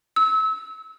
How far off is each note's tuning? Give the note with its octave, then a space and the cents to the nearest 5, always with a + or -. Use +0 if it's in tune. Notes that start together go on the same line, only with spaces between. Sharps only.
E6 -30